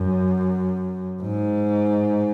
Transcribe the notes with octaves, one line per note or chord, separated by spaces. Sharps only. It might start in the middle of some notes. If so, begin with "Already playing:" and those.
Already playing: F#2
G#2